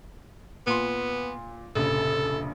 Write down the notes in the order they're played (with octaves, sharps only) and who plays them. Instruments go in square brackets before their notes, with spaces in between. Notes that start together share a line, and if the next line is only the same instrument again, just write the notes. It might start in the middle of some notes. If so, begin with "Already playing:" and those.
[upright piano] A#2 C6 [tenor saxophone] B3
[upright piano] F1 A#1 C#3 [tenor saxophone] A4